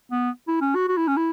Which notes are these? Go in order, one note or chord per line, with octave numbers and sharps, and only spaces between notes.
B3
E4
C#4
F#4
F#4
E4
C#4
E4